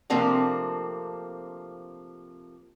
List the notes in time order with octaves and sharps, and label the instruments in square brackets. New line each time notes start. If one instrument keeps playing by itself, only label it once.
[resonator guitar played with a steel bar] C3 F3 A3 A#3 C4 D4